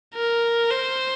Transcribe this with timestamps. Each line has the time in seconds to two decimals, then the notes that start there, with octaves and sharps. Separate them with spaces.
0.15 A#4
0.71 C5